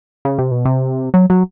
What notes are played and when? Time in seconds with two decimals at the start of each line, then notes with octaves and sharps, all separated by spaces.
0.25 C#3
0.39 C3
0.51 B2
0.65 C3
1.14 F#3
1.30 F#3